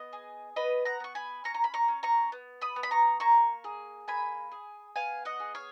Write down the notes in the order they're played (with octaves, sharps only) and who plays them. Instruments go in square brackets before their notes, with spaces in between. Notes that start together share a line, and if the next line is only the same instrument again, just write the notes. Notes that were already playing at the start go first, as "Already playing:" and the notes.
Already playing: [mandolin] B3 D#5
G#4
B3 B4 D#5
F#5 A#5
B3 C#6
G#5 B5
C#4 A#5 C#6
A#5
B5
A#5 C#6
C#4
A#5 C#6
B3
B5 D#6
B3
B5
A#5 C#6
A#3 A#5 C#6
G#4
A#3 G#5 B5
G#4
B3 F5 G#5
D#5 F#5
G#4
C#5 F5